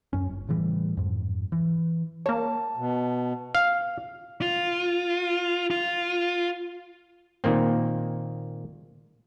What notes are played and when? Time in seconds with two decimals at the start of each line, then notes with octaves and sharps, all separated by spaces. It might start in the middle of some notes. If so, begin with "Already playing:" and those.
0.13 F#2 C#4
0.30 G1
0.49 A2 C#3 E3 G3
0.97 F2 G#2
1.52 E3
2.26 A#3 C#5 A5
2.77 B2
3.55 F5
4.42 F4
5.71 F4
7.44 A#2 D#3 A#3 C4